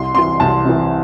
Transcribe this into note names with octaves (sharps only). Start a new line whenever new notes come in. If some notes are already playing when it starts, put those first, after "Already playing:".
Already playing: C2 C6
C3 E3 C6
C2 A5
C3 E3